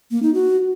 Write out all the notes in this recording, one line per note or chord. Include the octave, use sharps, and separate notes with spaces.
A#3
D#4
F#4